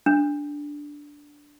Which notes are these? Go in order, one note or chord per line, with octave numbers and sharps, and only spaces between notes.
D4